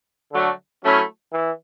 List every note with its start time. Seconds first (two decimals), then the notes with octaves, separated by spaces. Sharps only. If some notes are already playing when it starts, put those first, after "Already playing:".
0.31 D3 F#3 A3
0.83 F#3 A3 C#4 E4
1.33 E3